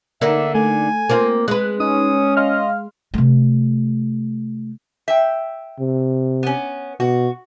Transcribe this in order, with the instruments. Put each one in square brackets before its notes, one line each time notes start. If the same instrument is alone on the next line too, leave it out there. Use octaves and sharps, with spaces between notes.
[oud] D3 A#3 D#4 [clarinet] E5
[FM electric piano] A3 [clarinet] G#5
[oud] A#3 C4 F4
[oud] G#3 B4 [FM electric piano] F#6
[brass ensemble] C#4 [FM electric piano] D#4 [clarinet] D#6
[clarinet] D#5 [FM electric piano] F5 C6 F6
[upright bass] C3 A3
[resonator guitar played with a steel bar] E5 G5
[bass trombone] C3
[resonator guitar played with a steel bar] B3 C#4
[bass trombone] B2 [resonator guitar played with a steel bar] F#4